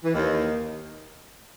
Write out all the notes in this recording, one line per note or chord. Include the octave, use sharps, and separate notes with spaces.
E3
D#2 D#3